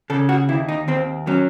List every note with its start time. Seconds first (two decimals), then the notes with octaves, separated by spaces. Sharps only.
0.10 C#3 A4
0.29 F#4
0.49 D#2 E4
0.68 D#4
0.88 D#2 C4
1.27 F#3 C#4